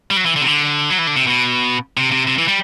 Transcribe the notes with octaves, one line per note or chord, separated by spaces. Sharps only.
G3
F#3
E3
D3
C3
D3
F#3
E3
D3
C3
B2
C3
C3
C3
E3
G3